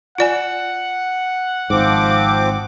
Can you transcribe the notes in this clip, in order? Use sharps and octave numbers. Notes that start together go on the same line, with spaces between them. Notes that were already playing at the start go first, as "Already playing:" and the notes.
F4 D5 F#5 G#5
G#1 G#2 F3 C4 D6